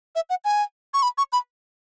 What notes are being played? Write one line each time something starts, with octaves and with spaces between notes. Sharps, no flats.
E5
F#5
G#5
C#6
B5
C#6
B5